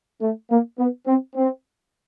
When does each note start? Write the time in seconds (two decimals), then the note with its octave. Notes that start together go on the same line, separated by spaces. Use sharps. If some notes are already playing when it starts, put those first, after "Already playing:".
0.21 A3
0.50 A#3
0.79 B3
1.07 C4
1.35 C4